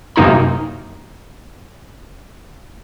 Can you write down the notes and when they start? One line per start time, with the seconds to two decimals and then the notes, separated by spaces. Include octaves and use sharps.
0.16 F#2 C3 A#3 D#4 C5 A#5